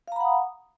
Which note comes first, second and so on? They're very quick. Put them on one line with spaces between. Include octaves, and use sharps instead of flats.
F5 A#5 B5 F#5 D#6